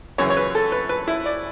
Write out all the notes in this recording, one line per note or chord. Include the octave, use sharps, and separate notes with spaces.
F#2 C#3 E3 C#5
C#5
B4
A4
B4
B4
E4
D5